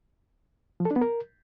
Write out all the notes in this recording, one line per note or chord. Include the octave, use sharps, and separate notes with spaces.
F3
A4
D4
B3
A#4